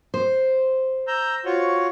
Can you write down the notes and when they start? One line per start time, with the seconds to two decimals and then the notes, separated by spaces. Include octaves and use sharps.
0.14 C5
1.07 A#5 E6 G6
1.45 F4 F#4 C#5